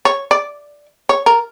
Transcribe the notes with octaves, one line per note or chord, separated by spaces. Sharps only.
C#5
D5
C#5
A#4